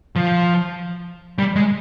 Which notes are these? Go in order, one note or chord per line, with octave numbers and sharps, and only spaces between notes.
F3
G3
G#3